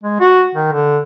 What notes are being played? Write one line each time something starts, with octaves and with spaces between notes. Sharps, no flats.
G#3
F#4
D#3
D3